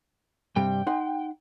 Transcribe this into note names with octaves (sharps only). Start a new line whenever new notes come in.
G2 C3 G3 G5
D#4 F#5 C6